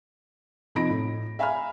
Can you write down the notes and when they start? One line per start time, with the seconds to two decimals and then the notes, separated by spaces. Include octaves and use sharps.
0.75 C3 F3 D#4 B5 A#6 D7
0.90 A2
1.39 E5 F5 G#5 A#5 B5 F6